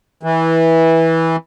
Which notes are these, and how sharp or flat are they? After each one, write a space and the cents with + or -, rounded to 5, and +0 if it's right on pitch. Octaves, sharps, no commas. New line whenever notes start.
E3 -15